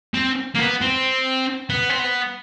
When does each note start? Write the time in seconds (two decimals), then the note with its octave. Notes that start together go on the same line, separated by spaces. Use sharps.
0.14 C4
0.55 A#3
0.59 B3
0.81 C4
1.70 B3
1.89 C4
1.99 B3